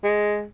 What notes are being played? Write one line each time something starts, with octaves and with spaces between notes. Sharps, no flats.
G#3